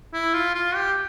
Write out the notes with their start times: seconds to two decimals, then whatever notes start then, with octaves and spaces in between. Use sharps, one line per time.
0.13 E4
0.34 F4
0.55 F4
0.76 G4